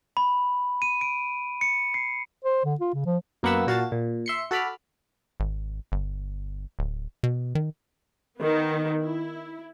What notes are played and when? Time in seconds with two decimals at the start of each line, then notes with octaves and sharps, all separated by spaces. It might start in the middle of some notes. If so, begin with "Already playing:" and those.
0.17 B5
0.82 D#7
1.01 D7
1.61 C#7
1.94 C7
2.45 C5
2.65 D3
2.81 F4
2.94 C#3
3.06 F3
3.43 F#2 A#3 B3 F#5 B5 E6
3.67 A#2 F#4 F5 A5 A6
3.92 A#2
4.26 E5 C6 C#7
4.51 F#4 A4 A5 B5 D6 F6
5.40 G#1
5.92 G1
6.79 D1
7.23 B2
7.55 D#3
8.38 D#3 B3
9.01 E4